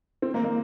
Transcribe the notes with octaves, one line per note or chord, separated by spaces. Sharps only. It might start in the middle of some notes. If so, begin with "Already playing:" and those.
C4
A#3
A#3